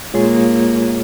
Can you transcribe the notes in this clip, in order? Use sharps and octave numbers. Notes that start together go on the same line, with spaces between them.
A#2 G#3 A#3 F4 G#4 C#5